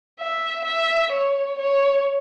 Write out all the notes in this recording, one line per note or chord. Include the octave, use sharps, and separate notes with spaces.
E5
E5
C#5
C#5